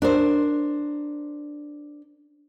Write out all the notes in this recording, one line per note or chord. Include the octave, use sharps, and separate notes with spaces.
D4 A#4 C5